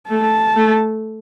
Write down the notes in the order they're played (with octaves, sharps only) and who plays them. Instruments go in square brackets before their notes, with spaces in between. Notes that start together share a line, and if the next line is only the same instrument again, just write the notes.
[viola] A3 [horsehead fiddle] A5
[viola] A3